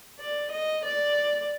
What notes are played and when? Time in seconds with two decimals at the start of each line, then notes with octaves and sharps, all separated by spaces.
0.20 D5
0.53 D#5
0.86 D5